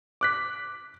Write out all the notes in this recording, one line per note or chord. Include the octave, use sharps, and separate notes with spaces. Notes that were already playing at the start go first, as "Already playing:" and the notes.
D6 F#6 B6